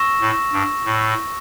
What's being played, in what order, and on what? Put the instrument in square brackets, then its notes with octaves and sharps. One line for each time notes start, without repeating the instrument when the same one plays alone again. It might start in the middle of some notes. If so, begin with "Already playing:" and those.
Already playing: [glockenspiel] C#6 E6 A#6 E7
[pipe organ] A2
G2
A2